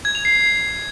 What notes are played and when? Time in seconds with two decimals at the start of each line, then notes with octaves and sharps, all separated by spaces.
0.05 G#6
0.15 F7
0.25 C7